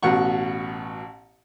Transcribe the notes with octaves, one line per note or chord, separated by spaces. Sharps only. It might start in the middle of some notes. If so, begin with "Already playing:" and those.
A1 B2 F#5 C#6